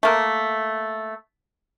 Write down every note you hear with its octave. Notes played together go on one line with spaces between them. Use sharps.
A3 A#3